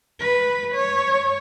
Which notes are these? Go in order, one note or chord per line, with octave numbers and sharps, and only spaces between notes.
B4
C#5